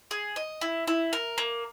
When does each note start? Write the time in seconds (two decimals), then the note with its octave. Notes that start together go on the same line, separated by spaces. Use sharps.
0.11 G#4
0.36 D#5
0.61 E4
0.87 E4
1.13 A#4
1.38 A#3